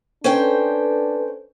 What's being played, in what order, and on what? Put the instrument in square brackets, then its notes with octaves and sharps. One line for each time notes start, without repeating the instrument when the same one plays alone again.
[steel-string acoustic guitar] C#4 C5 G5 [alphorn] D4 [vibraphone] A4 B4